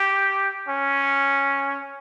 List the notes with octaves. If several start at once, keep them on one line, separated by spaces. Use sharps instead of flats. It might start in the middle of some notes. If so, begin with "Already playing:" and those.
Already playing: G4
C#4